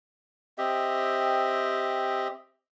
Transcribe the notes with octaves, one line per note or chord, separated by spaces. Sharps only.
C4 G4 D#5 E5